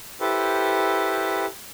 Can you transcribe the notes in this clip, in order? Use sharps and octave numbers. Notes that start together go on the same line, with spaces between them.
E4 G4 A4 B4 C5